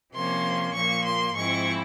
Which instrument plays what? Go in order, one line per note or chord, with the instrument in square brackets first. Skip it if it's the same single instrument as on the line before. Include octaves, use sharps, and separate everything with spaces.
[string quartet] C3 F3 A#3 C#4 C6
A#2 F3 A#3 C#6
C6
G#2 F3 G#3 C4 E4 C#6